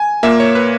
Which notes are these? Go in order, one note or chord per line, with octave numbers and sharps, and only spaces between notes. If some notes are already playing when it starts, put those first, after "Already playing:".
Already playing: G#5
A#2 A#3 E5
C#5
B4